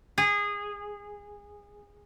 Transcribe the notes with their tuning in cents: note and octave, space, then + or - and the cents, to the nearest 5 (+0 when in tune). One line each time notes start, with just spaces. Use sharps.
G#4 -20